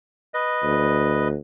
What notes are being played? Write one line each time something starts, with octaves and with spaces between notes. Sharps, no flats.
B4 D#5
D2